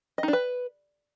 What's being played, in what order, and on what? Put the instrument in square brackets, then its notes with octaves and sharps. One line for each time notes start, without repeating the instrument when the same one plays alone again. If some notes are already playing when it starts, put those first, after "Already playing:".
[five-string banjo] D#5
D#4
D4
B4